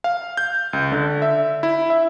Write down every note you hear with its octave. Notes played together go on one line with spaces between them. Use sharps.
F5
G6
C#2
D3
E5
E4
E5